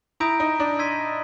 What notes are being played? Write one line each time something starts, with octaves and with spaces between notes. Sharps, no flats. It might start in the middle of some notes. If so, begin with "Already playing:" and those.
E4 A#5 D#6 G6 A#6 D7
D#4
D4
C6 E6 G#6 B6 D#7